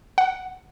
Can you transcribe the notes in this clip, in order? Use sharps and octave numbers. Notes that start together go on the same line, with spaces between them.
F#5